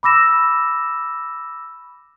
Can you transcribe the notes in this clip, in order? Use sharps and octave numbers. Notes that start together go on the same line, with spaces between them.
B5 D6 E6 A#6 E7